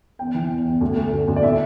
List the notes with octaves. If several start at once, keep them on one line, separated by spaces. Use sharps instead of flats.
E2 G5
E3
E2
E2
D2
A3
D2
D2
D5
A2 E5